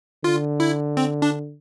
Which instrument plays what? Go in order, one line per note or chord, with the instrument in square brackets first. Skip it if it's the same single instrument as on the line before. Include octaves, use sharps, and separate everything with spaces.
[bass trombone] D3 [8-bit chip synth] F4
[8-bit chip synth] E4
C4
D4